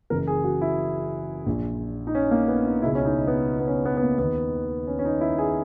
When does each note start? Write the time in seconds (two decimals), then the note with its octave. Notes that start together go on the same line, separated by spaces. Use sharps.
0.10 F#1 F#2 E3 A#4
0.27 G#4
0.44 F#4
0.61 E4
1.46 A#1 A#2
2.07 D#4
2.15 C#4
2.31 A#3
2.48 B3
2.65 D#4
2.82 C#2 B2 E4
2.95 C#4
3.05 D#4
3.27 B3
3.60 B3
3.67 C#4
3.85 B3
3.97 B3
4.02 A#3
4.18 D#2 D#3 B3
4.87 C#4
4.99 C#4
5.05 D#4
5.21 E4
5.38 G#4